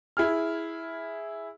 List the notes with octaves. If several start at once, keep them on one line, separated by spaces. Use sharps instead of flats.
E4 G#4 F6